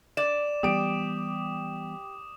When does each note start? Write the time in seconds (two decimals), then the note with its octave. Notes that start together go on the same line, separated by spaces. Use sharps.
0.17 D5 D6 E7
0.63 E3 G3 B3 G4 D#6 D7